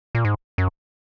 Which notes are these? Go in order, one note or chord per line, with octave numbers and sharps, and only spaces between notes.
A#2
G#2
F#2